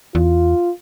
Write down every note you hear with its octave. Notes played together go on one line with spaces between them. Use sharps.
E2 F4